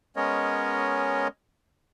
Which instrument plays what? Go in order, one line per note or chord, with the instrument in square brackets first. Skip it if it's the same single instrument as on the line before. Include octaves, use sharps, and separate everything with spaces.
[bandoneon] G#3 B3 C#4 A#4 C#5 D#5